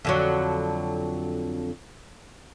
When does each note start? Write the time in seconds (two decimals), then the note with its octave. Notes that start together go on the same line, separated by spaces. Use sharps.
0.05 F2 D3 F#3